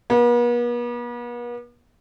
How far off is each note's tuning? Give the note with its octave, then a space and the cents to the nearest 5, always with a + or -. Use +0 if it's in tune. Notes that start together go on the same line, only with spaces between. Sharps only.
B3 -45